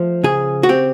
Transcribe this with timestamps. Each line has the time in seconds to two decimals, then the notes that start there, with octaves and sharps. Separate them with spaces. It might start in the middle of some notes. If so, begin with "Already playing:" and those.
Already playing: F3 A3
0.24 C#3 G#4
0.63 F#4
0.69 C4 G4